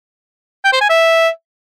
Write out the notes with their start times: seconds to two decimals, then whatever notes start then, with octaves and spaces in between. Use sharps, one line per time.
0.64 G5
0.73 C5
0.81 G#5
0.89 E5